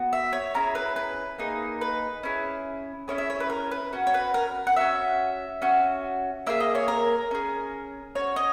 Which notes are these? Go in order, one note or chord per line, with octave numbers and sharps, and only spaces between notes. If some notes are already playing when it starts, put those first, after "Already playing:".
Already playing: B3 F#4
E5
C#5
C#4 E4 G#4 A#5
B4
B4
A#3 D#4 G#4
B4
C#4 E4 G#4
C#4 E4 G#4 C#5
E5
C#5
B4
A#4
B4
C#4 F#4
C#5
B4
A#4
F#5
C#4 F#4 E5
C#4 F#4
A#3 E4 G#4 E5
D#5
C#5
A#4
C#4 G#4
C#4 F#4 C#5
D#5